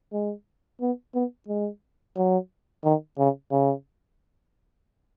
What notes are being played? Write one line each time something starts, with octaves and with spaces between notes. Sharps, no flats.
G#3
B3
B3
G#3
F#3
D#3
C#3
C#3